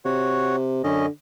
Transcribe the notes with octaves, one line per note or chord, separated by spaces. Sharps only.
C3 F#4 C#5 F#5
F#2 D3 C#4 D#5